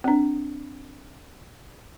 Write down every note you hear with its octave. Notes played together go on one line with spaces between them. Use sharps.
C4 D4